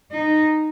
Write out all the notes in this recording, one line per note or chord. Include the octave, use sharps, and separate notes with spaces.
D#4